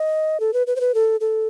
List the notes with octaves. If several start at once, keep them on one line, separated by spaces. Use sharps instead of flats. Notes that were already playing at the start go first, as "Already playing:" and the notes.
Already playing: D#5
A4
B4
B4
C5
B4
A4
A4